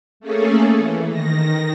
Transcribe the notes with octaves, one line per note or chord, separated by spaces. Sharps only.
A3 A#3 C#4 G#4 A4
E3
D#3 A#6